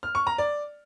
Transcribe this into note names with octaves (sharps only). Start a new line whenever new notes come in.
F6
C#6
A#5
D5